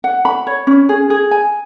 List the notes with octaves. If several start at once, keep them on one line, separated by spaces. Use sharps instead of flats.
F#5
B5
C#5
C#4
G#4
G#4
G#5